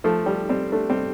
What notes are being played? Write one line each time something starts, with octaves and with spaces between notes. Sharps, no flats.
F3 A3
G3
G3 C4
A3 D4
G3 C4